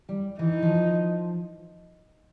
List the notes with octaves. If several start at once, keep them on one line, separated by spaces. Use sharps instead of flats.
G3
E3 D#4
F3